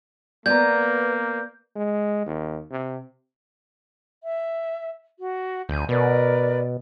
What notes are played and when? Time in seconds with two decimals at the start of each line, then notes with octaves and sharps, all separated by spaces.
0.46 A#3 B3 D5 A#5 G6
1.76 G#3
2.26 D#2
2.71 C3
4.23 E5
5.18 F#4
5.69 D2 G#5 G6
5.89 B2 A#4 B4 D5